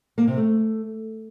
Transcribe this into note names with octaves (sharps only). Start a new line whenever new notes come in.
A#3
C3
A3